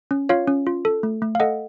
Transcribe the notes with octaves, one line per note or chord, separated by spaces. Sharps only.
C#4
F4 C#5 F5
C#4
F4
A4
A3
A3
F5
A4 D#5 F#5